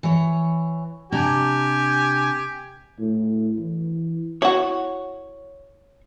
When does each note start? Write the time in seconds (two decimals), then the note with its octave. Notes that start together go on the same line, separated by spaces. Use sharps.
0.03 E3 C#5
1.12 C3 D4 G4 G#5 A#5
2.99 A2
3.60 E3
4.42 E4 F#4 C#5